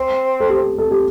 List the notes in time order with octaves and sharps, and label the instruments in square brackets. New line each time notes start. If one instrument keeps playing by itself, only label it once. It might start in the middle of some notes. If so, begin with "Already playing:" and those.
Already playing: [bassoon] C4
[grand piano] A4
G4
A4
G4